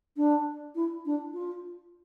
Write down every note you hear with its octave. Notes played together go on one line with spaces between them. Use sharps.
D4
E4
D4
F4